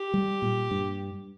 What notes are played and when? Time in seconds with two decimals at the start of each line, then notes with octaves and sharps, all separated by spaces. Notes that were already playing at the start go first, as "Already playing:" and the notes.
Already playing: G4
0.14 G3
0.42 A#2
0.71 G2